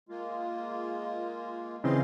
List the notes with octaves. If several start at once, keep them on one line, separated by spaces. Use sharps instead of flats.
G#3 A#3 F4
C#3 E3 C4 D#5 F5 C6